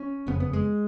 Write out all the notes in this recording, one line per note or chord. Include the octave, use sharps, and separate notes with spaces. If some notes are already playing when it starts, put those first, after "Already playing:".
Already playing: C#4
F#1 F2 C#3 B3
B3
G#3